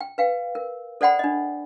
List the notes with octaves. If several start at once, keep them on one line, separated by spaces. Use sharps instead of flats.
G5
B4 F5 G5
A#4
A4 C5 D5 F#5 G5 B5
D4 D#5